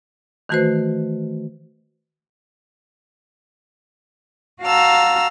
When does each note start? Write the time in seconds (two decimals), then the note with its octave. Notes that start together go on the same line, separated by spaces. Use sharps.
0.49 D#3 E3 A3 F#4 B4 C5
4.62 F#4 F5 A5 A#5 E6 F6